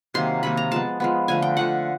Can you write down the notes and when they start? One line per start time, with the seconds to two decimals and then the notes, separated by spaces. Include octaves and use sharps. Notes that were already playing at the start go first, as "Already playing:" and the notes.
0.14 C3 D#3 F#3 A#3 C6
0.43 C3 D#3 F#3 A#3 B5
0.57 A#5
0.71 F3 G#3 B3 A5
1.00 F3 G#3 B3
1.28 D3 F3 A3 G#5
1.42 G5
1.57 D3 F3 A3 F#5